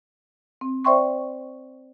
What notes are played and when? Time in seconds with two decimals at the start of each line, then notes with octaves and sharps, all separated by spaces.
0.61 C4
0.85 C5 D5 E5 G5 C6 C#6